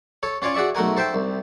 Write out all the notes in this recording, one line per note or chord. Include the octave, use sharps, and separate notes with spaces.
A4 C#5
C#4 F4 C#5 D5 G#5
F#4 G#4 D5 E5 C#6
B1 A3 F#4 A#4 G#5
A4 C5 E5 G5
C2